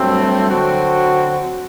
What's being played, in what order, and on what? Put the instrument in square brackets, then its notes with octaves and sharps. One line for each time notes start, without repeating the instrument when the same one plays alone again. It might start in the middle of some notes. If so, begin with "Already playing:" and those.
Already playing: [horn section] G2 F#3 A3 C4
D3 F#3 C4 F#4